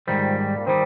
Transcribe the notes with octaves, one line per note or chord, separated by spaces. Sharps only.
G#2 D#3 F3 G3
D4
A#3
D#3 G3 C4